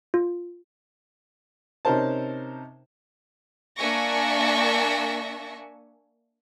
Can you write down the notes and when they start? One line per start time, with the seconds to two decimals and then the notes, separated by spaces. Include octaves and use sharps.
0.14 F4
1.85 C3 C#4 D#4 A#4 C5 A5
3.77 A#3 D4 E5 G#5 C#6 A#6